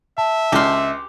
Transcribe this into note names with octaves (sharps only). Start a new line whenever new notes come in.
E5 A5
C#2 G4 C6 F6